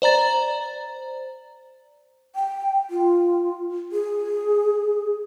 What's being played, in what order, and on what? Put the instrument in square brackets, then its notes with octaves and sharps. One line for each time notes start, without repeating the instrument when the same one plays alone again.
[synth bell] C5 D5 A#5 A6
[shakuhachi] G5
F4
G#4